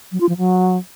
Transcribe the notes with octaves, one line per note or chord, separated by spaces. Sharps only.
F#3
F4
F3
F#3